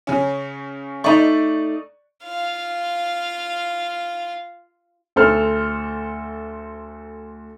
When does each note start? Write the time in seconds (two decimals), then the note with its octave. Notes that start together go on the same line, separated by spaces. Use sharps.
0.07 C#3 C#4
1.04 A3 D#4 D5 C#6
2.24 F4 F5
5.16 D2 A4 C5 F6